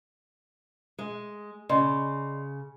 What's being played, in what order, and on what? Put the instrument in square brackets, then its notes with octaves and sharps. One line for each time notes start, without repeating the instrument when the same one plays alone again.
[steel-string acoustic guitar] G#3
[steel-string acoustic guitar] C#3 [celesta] D5 D#5 C6